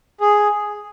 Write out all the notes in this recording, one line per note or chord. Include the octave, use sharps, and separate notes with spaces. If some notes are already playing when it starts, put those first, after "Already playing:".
G#4